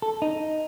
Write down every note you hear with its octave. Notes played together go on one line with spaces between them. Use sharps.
A4
D#4